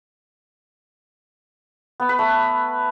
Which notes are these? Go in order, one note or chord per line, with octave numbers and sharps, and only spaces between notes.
B3
B4
A3